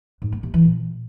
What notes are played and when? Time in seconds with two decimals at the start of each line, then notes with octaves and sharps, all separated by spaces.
0.22 G#2
0.32 A#3
0.43 C3
0.54 E3
0.64 A#2